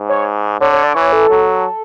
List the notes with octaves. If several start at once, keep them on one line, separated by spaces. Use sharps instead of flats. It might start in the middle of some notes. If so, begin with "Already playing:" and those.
Already playing: G#2
C#5
D3 C#5
C#5
D5
E3 C#5
A4
F#3